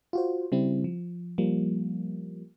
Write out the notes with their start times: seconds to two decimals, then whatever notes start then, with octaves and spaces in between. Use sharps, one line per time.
0.13 F4 F#4 C5
0.52 C#3 G3 C4 E4
0.84 F3
1.38 F3 G3 A#3